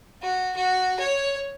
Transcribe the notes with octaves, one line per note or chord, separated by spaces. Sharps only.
F#4
F#4
C#5